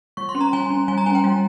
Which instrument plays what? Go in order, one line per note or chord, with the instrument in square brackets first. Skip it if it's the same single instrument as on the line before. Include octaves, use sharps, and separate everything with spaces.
[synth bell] G3 C#6
C6
C#4
A#5
G3 G#5
C#4
G3 G#5
A#5
C#4 G#5
G5
G3